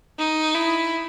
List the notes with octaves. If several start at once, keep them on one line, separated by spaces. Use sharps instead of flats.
D#4
E4